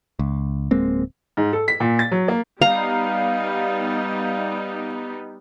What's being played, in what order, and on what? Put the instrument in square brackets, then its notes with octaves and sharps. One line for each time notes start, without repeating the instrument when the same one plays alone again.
[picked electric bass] C#2
D1 G#3 A#3 C4
[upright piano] G#2
A4
B6
A#2
A6
F#3
A#3
[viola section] G3 B3 D#4 [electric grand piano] F5 [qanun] A#5